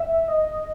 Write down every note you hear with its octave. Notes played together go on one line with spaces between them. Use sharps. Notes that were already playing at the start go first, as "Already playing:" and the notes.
Already playing: E5
D#5